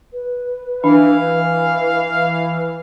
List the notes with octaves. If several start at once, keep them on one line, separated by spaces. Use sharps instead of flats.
B4
E3 D4 F5